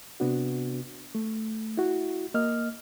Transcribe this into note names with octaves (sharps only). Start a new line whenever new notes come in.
C3 B3 D4 F#4
A3
E4 F#4
A#3 D#5 F6